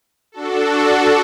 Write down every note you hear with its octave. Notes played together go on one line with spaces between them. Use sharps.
D4 F#4 A4